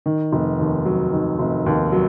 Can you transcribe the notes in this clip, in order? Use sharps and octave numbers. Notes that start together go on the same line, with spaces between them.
D#3
F1
D#2
F#3
D#3
F1
D#2
F#3